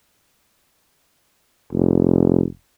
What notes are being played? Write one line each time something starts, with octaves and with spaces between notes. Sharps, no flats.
F1